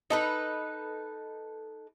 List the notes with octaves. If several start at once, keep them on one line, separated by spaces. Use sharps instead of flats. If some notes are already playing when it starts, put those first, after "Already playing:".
D#4 A4 B4